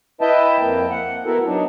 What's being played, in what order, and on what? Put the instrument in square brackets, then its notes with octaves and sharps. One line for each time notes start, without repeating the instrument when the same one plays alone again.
[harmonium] E4 B4 D#5 E5 G5 A5
F2 A#3 G5
F#5
B3 E4 F#4 A4 A#4
F#3 D4 D#4